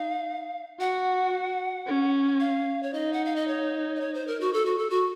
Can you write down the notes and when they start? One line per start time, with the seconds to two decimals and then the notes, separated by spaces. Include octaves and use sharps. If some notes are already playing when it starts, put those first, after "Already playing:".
Already playing: D#4 F5
0.80 F#4 F#5
1.87 C#4
2.40 F5
2.83 C#5
2.93 D#4 D#5
3.13 F#5
3.25 F5
3.36 D#5
3.48 C#5
3.95 D#5
4.01 C#5
4.14 C5
4.27 A#4
4.41 F#4
4.53 A4
4.66 F#4
4.78 A4
4.90 F#4